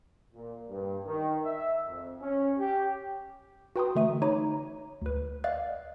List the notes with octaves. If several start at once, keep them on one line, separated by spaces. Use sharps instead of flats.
A#2
G2
D#3
E5
F2
C#4
G4
F#4 B4 G5 A#5 C6 D#6
D3 E3 A3 E5 D#7
D#4 C#5 A#5 B5 D6 D#7
D2 B4
D5 D#5 F5 F#5 F#6 A6